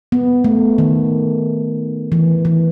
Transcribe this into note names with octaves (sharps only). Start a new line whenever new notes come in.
B3
A3
D#3
E3
E3